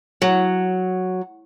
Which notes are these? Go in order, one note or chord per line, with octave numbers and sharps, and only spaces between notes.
F#3